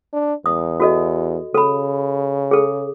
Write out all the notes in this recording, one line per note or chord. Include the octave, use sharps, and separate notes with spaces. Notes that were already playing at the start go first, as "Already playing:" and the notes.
D4
E2 D#6
F#4 A4 D#5
C#3 A4 B5
G#4 A4